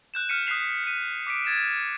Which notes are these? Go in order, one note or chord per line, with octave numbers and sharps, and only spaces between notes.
F#6 G6 E7
F6 B6 C#7 D#7
D#6 F#6 B6 C7 F7
B6 D#7
D6 B6 D7
G#6 A6 B6 E7